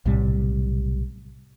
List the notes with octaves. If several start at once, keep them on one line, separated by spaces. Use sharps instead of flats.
B1 A2 C3 G3